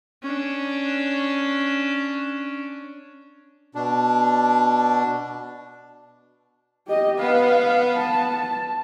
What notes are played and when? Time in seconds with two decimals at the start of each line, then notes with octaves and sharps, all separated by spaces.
0.23 C#4 D4
3.75 B2 D4
6.88 G4 D#5
7.20 B3 F5
7.96 A5